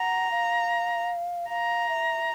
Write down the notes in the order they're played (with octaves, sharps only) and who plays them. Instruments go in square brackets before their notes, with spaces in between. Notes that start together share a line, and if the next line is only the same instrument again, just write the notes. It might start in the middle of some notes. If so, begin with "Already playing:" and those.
Already playing: [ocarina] F#5 [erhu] A#5
[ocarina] F5
[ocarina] F5 [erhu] A#5
[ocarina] E5